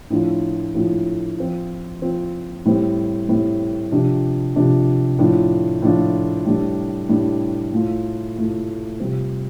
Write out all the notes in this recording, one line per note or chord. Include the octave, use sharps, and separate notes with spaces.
A2 F3 D4 F4
A2 F3 D4 F4
F3 C4 F4
F3 C4 F4
A2 G3 C4
A2 G3 C4
C3 F3 D4
C3 F3 D4
A2 F3 D4 F4
A2 F3 D4 F4
A2 G3 D4
A2 G3 D4
A2 A3 F4
A2 A3 F4
C3 G3 C4 F4